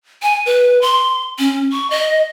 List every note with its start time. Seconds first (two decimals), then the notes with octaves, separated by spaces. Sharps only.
0.23 G#5
0.46 B4
0.82 C6
1.39 C#4
1.73 C#6
1.90 D#5